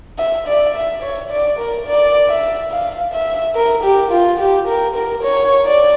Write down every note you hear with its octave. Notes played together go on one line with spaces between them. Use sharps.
E5
D5
E5
C#5
D5
A#4
D5
E5
F5
E5
A#4
G4
F4
G4
A#4
A#4
C#5
D5